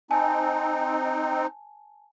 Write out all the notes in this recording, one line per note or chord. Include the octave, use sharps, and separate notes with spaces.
C4 D#4 G#5 A5